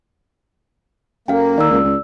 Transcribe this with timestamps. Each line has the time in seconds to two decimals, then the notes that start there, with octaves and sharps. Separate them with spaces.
1.28 F#2 A#3 A4 F5 G5
1.58 D#3 D5 E6
1.71 C#2
1.84 C#2